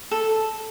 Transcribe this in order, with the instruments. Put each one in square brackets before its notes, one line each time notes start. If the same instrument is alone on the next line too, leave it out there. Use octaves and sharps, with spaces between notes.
[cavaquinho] A4